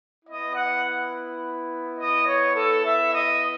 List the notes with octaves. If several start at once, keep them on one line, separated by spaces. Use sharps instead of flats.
B3 E4 D#5
F#5
D#5
C#5
A4
E5
D#5